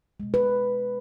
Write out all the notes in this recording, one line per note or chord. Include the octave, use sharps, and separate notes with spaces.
B2 G#3
B4